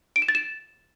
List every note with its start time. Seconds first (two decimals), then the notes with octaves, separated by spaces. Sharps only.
0.16 D7
0.22 E7
0.28 A6
0.35 E7